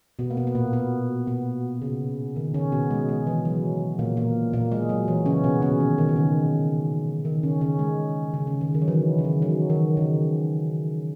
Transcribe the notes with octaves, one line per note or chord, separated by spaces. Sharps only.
B2 B3
A#3
B2 B3
B3
A#2 A#3
B2 B3
B2 B3
C#3
D#3
C#3 C#4
B2 B3
G#3
G#3
E3
F#3
A#2 A#3
A#2 A#3
A#2 A#3
G#3
F#3
E3
C#3 C#4
B2 B3
C#3 C#4
D#3
D#3
D#3
C#3
D#3
C#3 C#4
C#3 C#4
G#3
C#3
C#3
D#3
D#3
F#3
E3
C#3
D#3
F#3
D#3
C#3